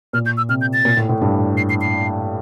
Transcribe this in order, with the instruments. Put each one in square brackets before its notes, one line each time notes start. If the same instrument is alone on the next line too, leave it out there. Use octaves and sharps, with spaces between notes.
[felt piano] A#2 [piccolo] F6
[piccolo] G6
E6
[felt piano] C3 [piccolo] F6
[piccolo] G6
A6
[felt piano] A#2
A2
A2
G2
[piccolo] C7
C7
C7